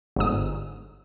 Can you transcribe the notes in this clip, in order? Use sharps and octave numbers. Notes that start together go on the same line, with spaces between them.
G1 G#2 D#6